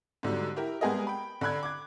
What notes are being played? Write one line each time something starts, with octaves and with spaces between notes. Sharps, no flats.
G#2 D3 F#3 G3
E4 G4 A#4
G3 G#3 B3 G#4 A#4 D#5
G5 B5
D3 D4 B5 F#6 G#6
D6 G#6